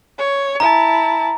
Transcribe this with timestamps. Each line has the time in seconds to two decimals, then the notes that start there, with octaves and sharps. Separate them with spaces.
0.18 C#5
0.60 E4 A5 A#5